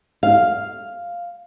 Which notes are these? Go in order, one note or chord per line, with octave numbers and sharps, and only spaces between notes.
F5